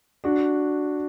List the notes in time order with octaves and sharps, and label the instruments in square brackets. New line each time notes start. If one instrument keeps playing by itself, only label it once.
[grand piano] D4 F#4